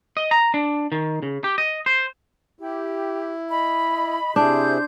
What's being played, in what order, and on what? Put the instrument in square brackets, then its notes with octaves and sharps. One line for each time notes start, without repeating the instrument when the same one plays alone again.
[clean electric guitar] D#5
A#5
D4
D#3
C#3
G4
D#5
C5
[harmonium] E4 [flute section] G4
[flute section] D#5 B5
[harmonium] C3 E4 G#4 [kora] D4 [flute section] C5 G6